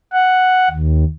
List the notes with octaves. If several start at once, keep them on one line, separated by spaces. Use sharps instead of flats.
F#5
D#2